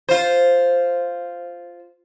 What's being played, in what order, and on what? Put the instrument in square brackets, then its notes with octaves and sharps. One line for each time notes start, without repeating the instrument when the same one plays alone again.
[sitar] F4 C5